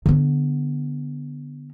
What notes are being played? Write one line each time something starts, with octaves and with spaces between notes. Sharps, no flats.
D3 B3